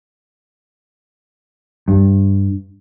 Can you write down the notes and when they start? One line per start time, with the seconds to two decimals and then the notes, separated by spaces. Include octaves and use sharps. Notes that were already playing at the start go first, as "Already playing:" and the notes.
1.88 G2